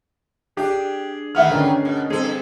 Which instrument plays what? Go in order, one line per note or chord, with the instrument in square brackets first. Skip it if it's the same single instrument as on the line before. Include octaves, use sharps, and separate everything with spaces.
[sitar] D4 [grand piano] G4 [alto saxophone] G#4
[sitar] D#3 A3 B3 [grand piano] E5 F#5 F6
[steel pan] D3 B4 [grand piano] C#4 D4 A#4
[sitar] B2
[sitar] G2 A4 [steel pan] C4 [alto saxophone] G#4